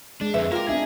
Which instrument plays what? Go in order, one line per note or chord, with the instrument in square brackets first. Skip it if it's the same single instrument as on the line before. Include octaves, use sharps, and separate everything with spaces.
[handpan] G#3 [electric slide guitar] D4
[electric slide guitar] F2 D3 C4 [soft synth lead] B4 [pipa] E5
[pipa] A#3 G4 [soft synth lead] F4 [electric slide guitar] A#4
[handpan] C4 D4 D#4 [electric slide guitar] G#4 [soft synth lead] E5